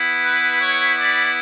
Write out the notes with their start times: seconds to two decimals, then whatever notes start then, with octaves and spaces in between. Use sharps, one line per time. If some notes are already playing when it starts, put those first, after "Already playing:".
Already playing: B3 E4
0.22 B4
0.57 C#5
0.95 D5